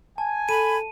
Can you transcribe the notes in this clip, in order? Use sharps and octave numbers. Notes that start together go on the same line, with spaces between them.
G#5 A5
A4 B5 D#7